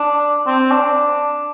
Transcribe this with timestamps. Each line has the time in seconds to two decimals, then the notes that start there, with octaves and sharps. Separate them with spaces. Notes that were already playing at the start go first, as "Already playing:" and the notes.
Already playing: D4
0.46 C4
0.71 D4